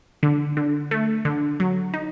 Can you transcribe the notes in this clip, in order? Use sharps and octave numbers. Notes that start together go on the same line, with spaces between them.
D3
D3
A3
D3
F#3
D#4